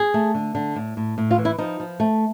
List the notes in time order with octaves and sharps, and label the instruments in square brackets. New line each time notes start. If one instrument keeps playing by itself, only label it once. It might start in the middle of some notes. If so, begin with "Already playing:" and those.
Already playing: [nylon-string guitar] G#4
A3
D3
D3
A2
A2
A2
F4
E3
E4
F3 D#4
F3
A3